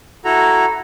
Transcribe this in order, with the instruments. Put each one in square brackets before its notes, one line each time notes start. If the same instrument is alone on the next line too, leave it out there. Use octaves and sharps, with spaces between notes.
[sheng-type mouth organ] E4 F#4 A4 A#5